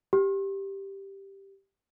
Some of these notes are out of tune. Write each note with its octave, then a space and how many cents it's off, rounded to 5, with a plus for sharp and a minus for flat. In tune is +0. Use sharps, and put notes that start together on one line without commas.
G4 +0